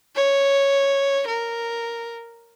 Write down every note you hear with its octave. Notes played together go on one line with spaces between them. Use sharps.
C#5
A#4